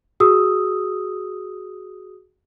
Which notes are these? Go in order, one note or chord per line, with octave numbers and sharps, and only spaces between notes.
F#4 G#4 D#6 E6